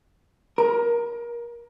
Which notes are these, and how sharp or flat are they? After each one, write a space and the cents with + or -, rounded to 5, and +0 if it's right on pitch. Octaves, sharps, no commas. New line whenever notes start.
A#4 +25